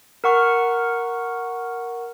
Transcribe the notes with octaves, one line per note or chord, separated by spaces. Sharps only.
A#4 F#5 C#6 F6